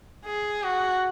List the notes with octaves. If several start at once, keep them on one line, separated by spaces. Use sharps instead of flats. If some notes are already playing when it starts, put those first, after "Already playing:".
G#4
F#4